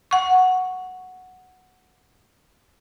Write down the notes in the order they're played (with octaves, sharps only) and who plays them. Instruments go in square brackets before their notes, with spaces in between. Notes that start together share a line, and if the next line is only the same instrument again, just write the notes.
[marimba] F#5 C#6